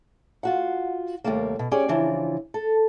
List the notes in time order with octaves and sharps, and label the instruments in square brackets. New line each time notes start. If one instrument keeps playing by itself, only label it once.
[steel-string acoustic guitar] F4 F#4 F#5
D#2 C3 G3 A3 A#3
B2
C#4 G4 G#4 D5
C#3 E3 F3 D4
A4